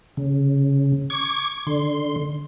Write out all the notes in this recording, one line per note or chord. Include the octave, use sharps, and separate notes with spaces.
C#3
C#6 D6 G#6
D3 C6